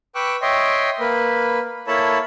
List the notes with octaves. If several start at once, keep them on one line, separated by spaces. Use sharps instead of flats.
B4 G5 C#6 D6 E6 F#6
C#5 D#5 E5 G5 C6
A#3 B4
A#3 E4 A4 C#5 A5 B5